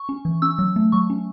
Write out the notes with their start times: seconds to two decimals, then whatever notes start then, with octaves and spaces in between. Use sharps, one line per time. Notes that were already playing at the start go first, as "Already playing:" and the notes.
Already playing: C#6
0.09 C#4
0.25 E3
0.42 C#4 E6
0.59 F#3
0.76 A3
0.92 F#3 C#6
1.10 C#4